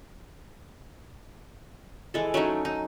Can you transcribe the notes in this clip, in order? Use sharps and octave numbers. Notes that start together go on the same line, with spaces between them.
E3 G#3 A4
F#3 A3 C#4 D#4
D#4